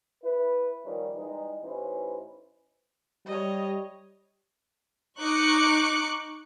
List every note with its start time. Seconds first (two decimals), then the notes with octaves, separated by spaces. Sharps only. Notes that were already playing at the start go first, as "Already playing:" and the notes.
0.24 E4 B4
0.85 D#3 F3 G3 C#4 D#4
1.15 E3 G3 G#3 D#4
1.63 A1 E3 C#4 D#4 B4 C5
3.26 G3 C#5 D#5
5.19 D#4 C#6 D6 F#6 C#7